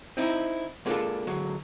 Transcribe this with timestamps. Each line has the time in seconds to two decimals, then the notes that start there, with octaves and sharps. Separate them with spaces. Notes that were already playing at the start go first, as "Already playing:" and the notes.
0.17 C4 D#4 E4
0.86 G#3 A#3 B3 D4 F4 A4
1.27 D3 F#3 G#3